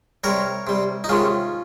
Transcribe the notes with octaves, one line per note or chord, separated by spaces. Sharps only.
C3 G3 A#4 C#5
C3 G3
D#4
C3 D#3 G#3 C#4 F4